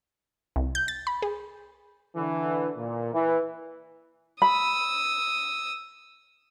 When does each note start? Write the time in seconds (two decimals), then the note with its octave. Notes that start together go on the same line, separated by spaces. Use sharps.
0.56 C2
0.75 G6
0.88 A6
1.07 B5
1.22 G#4
2.16 D3 E3
2.77 A#2
3.13 E3
4.42 B5 D#6 E6